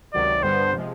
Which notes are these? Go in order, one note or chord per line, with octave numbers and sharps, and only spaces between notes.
C#2 C3 D#3 F#3 D5
G2 D3 G3 B3 C5
C3 F3 G#3